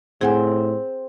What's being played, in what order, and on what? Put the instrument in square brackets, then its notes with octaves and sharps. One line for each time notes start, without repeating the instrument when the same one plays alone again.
[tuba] A2 [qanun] C4 [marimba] G#4 F#5 G#5